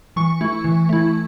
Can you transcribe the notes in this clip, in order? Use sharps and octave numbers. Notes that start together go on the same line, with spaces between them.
E3 C#6
A3 E4
E3
A3 E4